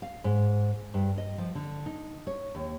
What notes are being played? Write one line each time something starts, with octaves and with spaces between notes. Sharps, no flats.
F5
G#2
G2
D#5
F3
D3
D#4
C#5
D#2